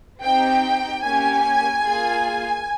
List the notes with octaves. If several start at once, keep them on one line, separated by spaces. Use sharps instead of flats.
C4 D#4 G4 G5
A#3 C#4 G4 G#5
A#3 F4 G#4